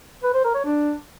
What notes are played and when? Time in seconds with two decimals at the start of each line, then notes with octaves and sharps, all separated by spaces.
0.23 B4
0.34 C5
0.44 A#4
0.55 C#5
0.65 D4